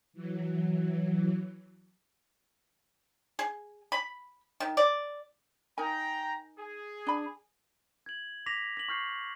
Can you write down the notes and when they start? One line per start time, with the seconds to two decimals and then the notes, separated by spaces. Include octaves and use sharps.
0.13 E3 F#3
3.39 G#4
3.92 B5
4.60 D#3
4.77 D5
5.78 D#4 A#4 G5 G#5 A#5
6.59 G#4
7.07 D4 B5
8.06 G#6 F#7
8.46 D6 A#6 B6 F7
8.77 B6 F#7
8.89 C#6 F6 G6 C7